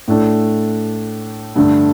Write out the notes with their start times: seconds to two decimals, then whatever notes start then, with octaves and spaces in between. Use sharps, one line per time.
0.08 A2 A3 D4
1.56 G2 D3 A3 D4